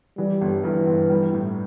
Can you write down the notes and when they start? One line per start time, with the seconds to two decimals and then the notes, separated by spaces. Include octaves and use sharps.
0.18 E3 G3
0.41 G1
0.64 G2 E3
0.87 G1
1.10 G3
1.33 A2